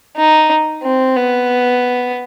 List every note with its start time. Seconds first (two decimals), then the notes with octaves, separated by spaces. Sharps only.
0.17 D#4
0.84 C4
1.17 B3